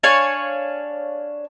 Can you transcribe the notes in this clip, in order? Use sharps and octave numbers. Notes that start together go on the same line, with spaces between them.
D4 C#5 F5 G#5